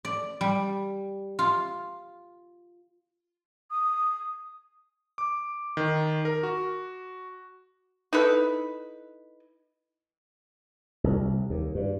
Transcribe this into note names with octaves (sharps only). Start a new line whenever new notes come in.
D5
G3
F4
D#6
D6
D#3
A#4
F#4
D#4 E4 A4 B4
C2
D#2
G2